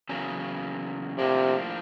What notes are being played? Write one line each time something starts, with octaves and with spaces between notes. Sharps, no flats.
E2 C#3 F#3 A#3
A2 C3 F3 A#3 D4